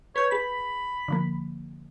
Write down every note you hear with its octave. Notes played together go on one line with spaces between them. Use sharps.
B4 C#5 G6
G#4 B5 B6
D3 F3 A#3